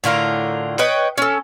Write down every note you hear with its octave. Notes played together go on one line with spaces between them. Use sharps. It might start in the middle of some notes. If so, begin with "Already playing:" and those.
A2 D3 F4 A#4
B4 C#5 D#5 G5
C#4 A4